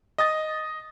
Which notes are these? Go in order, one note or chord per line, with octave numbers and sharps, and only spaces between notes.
D#5 D#6 A6